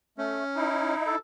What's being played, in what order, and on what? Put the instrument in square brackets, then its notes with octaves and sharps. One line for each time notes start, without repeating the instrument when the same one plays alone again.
[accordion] A3 [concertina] C#4
[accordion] D#4 E4
[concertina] A4